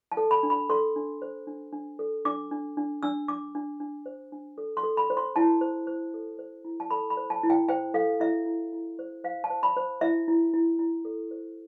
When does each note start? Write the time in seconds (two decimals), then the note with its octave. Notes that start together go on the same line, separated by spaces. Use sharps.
0.12 A5
0.17 A4
0.31 B5
0.43 D4
0.50 B5
0.69 A4 C6
0.96 D4
1.22 C5
1.47 D4
1.73 D4
1.99 A4
2.25 D4 D6
2.51 D4
2.77 D4
3.03 D4 E6
3.28 D4 D6
3.55 D4
3.80 D4
4.06 C5
4.32 D4
4.58 A4
4.77 C6
4.83 A4
4.97 B5
5.10 C5
5.17 C6
5.36 E4 A5
5.61 C5
5.87 C5
6.14 A4
6.39 C5
6.65 E4
6.80 A5
6.90 A4 B5
7.10 B5
7.17 C5
7.30 A5
7.43 E4
7.50 G5
7.69 C5 G5
7.94 A4 F5
8.20 E4 E5
8.46 E4
8.73 E4
8.99 C5
9.24 C5 F5
9.44 A5
9.50 C5
9.63 B5
9.77 C5
10.01 E4 E5
10.28 E4
10.54 E4
10.79 E4
11.05 A4
11.31 C5